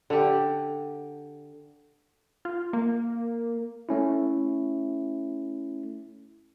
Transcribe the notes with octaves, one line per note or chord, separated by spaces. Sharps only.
D3 G4
F4
A#3
A3 C#4 E4